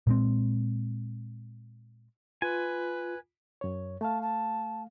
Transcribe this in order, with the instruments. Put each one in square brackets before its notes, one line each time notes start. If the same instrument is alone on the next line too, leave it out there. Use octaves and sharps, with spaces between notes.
[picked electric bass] A#2 G#3 C4
[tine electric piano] F4 [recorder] B4 [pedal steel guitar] G#5
[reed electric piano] F#2 C#5
[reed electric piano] A3 F5 [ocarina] A5
[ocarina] A5